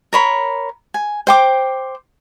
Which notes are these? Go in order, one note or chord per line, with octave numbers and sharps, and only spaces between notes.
A#4 C#5 B5
G#5
C5 G5 D6